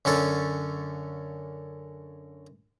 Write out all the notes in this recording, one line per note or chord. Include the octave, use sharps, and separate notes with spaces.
F#2 D3 C#4 A4